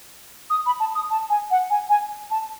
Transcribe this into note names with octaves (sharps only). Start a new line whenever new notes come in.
D#6
B5
A5
D#6
A5
G#5
F#5
G#5
G#5
A5